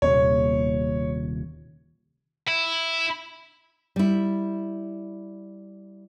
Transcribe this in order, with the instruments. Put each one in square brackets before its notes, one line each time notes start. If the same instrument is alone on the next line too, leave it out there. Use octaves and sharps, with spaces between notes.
[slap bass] D#1 D#2 C3 [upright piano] C#5
[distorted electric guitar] E4
[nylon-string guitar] G3 E4